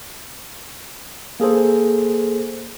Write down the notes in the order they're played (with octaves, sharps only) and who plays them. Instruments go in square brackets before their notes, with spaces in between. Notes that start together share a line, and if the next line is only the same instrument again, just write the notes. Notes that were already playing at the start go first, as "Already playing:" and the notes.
[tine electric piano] A#3 G#4 A4 C5